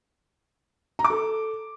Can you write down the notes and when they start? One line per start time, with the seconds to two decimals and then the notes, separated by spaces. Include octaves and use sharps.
0.99 A#5
1.05 D6
1.10 A4